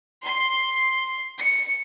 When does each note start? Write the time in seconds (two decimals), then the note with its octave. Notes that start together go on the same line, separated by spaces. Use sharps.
0.24 C6
1.40 C#7